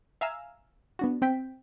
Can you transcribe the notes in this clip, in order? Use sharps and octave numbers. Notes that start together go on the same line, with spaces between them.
E5 F5 G#5 A#5 E6 F6
B3 D4 F#4
C4 G5 B6